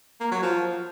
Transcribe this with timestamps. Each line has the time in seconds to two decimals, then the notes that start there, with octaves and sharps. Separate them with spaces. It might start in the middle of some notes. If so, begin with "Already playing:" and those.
0.20 A#3
0.31 F#3
0.43 F3